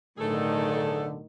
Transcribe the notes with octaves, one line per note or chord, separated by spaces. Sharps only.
B1 A2 D3 D#3 A3 G#4 A4